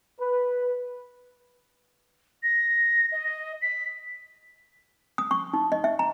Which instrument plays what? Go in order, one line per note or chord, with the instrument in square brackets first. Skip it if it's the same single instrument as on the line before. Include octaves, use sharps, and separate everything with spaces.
[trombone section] B4
[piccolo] A#6
D#5
B6
[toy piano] D#6
C#6
D#4
D#5
E5
A#5